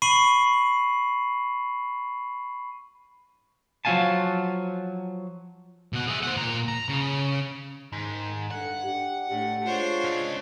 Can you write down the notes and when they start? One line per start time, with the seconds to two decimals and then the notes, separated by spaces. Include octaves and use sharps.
0.02 B5 C#6 C7 D#7 F#7
3.85 F3 F#3 E4 F5 G#5 A5
5.93 B2 F#5
6.07 G#4 E5
6.23 C5 F#5
6.37 A#2 A#5
6.68 A#5
6.89 C#3
7.92 G#2 D#3
8.51 G2 D3 F#5
8.84 D4 G4
9.31 A2 D4 G4
9.65 G#3 D4 F4 C5 C#5
10.04 C#4 D#5